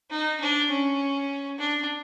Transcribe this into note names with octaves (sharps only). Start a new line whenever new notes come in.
D#4
D4
C#4
D4